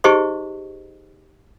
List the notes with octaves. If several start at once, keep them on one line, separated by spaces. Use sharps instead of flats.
D#4 G4 G#4 C5 D#5 C#6